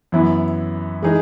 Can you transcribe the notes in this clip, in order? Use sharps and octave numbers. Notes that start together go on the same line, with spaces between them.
F#2 E3 B3 E4
E3 G#3 D#4 G#4